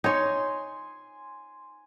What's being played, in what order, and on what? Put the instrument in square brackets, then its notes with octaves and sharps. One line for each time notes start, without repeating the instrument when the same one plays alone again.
[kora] D#4 C#5 [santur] G#5 C6